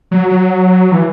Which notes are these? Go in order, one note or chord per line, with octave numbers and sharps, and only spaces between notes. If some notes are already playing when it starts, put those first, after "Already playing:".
F#3
F#3
E3